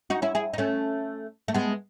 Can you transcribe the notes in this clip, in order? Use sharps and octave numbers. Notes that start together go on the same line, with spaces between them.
D#4 F#4
C#4 E4
E4 G#4
D#4
A3 C#4
A3
G#3 B3